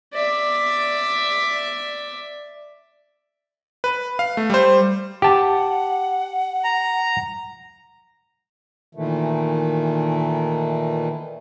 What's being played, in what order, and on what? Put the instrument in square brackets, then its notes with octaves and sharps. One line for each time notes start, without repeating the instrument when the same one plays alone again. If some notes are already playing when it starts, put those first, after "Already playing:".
[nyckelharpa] D5 E5
[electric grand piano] B4
F5
A3
G3 C5
[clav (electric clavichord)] G4 A5 [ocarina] F#5
[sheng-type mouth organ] A#5
[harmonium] A#2 D#3 E3 A3